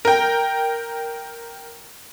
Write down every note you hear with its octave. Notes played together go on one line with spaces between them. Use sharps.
A#4 G5